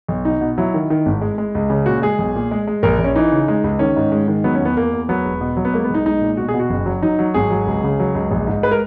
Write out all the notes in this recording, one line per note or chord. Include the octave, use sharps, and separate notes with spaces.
B1
B2 D#4
B2
F#3 E4
D#3
D#3
G#1
G#3
G#3
C#2
C#3
A#2 F#4
G#3 G#4
B1
A#2
G#3
G#3
A#1 A#4
A#1
C#4
E3 D#4
C#3
G#3
C#2
D#3 C#4
G#2
G#3
D#3
F#3 B3
C#4
E2 B3
E2 A#3
E2
F#3 B3
E1
B2
F#3
B3
G#3 A#3
B3
B1 D#4
G#3 D#4
A#2
B2 F#4
G#4
B2
F#4
F#1
F#3
F#3 D#4
F#3
G#1 G#4
F#3
C#2
C#3
F#3
C#2
A#1
G#2
G#3 B4
A#4